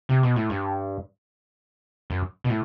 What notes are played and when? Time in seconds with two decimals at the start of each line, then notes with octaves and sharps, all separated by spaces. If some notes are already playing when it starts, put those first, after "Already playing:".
0.09 C3
0.23 B2
0.36 A2
0.50 G2
2.10 F#2
2.44 B2
2.50 A2